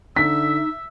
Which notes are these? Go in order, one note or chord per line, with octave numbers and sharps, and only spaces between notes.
D3 D#4 E5 B6